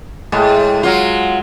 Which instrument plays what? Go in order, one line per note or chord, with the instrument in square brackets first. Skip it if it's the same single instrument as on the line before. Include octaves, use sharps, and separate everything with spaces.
[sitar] A2 [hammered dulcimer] G#3
[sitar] F#3 F4